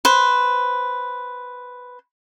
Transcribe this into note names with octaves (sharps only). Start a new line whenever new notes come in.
B4 C5